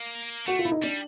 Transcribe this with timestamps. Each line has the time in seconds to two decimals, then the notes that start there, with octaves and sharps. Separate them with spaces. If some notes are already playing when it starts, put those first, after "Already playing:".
Already playing: A#3
0.47 A3 F#4
0.59 F4
0.65 E4
0.72 D#4
0.83 G3 D4